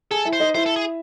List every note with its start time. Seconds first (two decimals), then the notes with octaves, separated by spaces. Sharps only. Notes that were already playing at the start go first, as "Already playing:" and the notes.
0.11 G#4 A4 G#5
0.25 E4 E5
0.33 C5
0.40 D#4 D#5
0.55 E4 C5 E5
0.66 A4
0.76 G#4